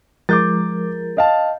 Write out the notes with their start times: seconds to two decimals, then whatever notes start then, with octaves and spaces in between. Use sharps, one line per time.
0.29 F3 G#3 A#4 D6 G6 A6
1.17 D#5 F5 A5